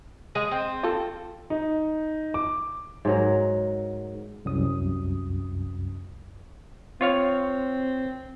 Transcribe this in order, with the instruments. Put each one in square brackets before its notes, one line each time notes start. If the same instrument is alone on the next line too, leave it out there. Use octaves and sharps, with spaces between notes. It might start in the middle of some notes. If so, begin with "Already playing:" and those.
[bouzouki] G#3 G#4
C4
[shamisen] F4 A4
[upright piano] D#4
D6
[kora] G#2 F#3 A#4
[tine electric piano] C2 F#2 D#6
[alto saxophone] C4 [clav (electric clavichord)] F4 C#5 F5